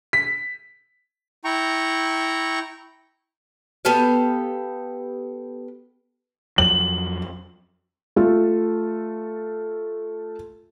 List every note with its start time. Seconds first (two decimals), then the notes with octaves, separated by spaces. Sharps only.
0.13 B6
1.44 E4 G5 A#5 C#6
3.85 B3 G4 A4 F5
6.58 F2 F#3 F#7
8.16 A3 F4 A4